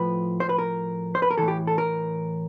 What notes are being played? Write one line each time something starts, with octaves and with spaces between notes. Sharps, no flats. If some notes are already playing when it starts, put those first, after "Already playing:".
Already playing: A2 F3 B4
C5
B4
A#4
C5
B4
A#4
A2 E3 A4
G4
A4
A#4